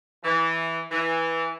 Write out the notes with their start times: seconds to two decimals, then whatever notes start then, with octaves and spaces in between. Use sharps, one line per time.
0.24 E3
0.91 E3